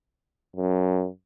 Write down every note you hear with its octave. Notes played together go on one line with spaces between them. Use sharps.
F#2